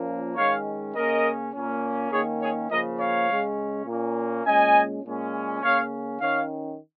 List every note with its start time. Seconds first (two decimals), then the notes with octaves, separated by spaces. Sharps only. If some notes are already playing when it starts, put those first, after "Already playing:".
Already playing: A#2 F3 A#3 C#4
0.36 D#3 G#3 C#4 C#5 F5
0.95 C#3 A#3 C#4 A#4 D#5
1.53 A#2 A#3 C#4
2.11 D#3 A#3 C#4 G#4 C#5
2.41 G#4 C#5
2.70 C#3 F3 A#3 A#4 D#5
2.99 C#5 F5
3.28 C#3 G#3 C#4
3.87 A#2 A#3 C#4
4.45 A#2 G#3 C#4 D#5 G#5
5.04 A#2 G#3 C#4
5.62 C#3 A#3 C#4 C#5 F5
6.20 D#3 C#4 C#5 F5